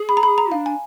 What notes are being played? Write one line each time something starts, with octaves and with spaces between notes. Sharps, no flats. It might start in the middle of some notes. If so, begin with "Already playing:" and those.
Already playing: G#4
B5
A#5
B5
A#5
D4 F5
G#5